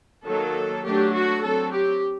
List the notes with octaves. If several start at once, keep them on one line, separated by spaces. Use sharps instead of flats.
D#3 F#3 A#3 A4
F#3 A3 D4 G4
F#4
F#3 C4 A4
G4